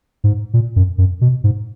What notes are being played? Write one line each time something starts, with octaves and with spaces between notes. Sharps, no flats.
G#2
A#2
F#2
F#2
B2
G#2